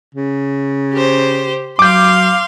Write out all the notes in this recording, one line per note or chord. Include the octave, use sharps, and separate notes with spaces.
C#3
G4 C5
F#3 F5 C6 D6 G6